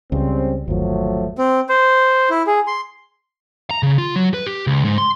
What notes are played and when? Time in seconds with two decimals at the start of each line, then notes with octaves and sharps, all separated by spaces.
0.12 C#2 C#3 G3 C4
0.68 G1 D#2 F3 F#3 A3
1.37 C4
1.69 C5
2.30 E4
2.47 G#4
2.67 C6
3.71 A#5
3.83 C#3
3.98 F4
4.16 F#3
4.34 B4
4.46 G4
4.67 C#2
4.85 G#2
4.98 C6